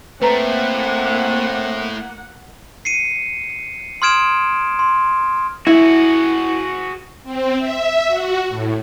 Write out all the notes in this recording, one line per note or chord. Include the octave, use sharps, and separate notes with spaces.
A3 A#3 C4 E4 B4 F#5 A#5
C7 C#7 D#7
C6 D#6 F6 G#6 D7 E7
C6
E4 F#4 G#4
C4
E5
F#4
A2